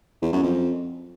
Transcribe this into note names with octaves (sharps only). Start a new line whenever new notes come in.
E2
F#2
F2